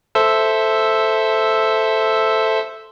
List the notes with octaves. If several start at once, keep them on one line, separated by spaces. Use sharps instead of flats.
A4 C5 E5